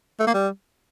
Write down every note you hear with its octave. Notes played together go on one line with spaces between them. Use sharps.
A3
A#3
G3